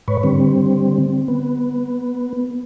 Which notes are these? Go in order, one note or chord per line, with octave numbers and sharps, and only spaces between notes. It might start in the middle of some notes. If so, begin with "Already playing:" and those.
G#2 B4 C#5
D3 G3 C4
B3